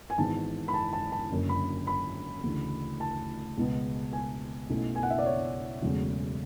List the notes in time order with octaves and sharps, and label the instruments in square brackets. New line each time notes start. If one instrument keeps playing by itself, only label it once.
[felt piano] G#5
G#1 G#2 E3 B3 A5
B5
A5
A5
A5
F#1 F#2 D3
B5
B5
D2 C#3 E3
A5
C#2 B2 G#3 B3
G#5
B1 B2 A3 C#4 E4
G#5
F#5
E5
D5
C#5
E1 E2 C#3 F#3 A3